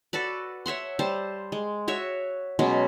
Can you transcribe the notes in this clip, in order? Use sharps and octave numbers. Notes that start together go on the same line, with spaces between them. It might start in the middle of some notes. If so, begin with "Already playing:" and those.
F#4 A4 B4 D5
C#5 E5 F#5 C6
G3 C5 A5
G#3
F#4 C#5 E5
B2 F#3 G#3 C#4